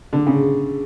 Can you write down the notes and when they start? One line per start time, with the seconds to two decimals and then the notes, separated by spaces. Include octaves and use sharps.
0.13 D3
0.27 C#3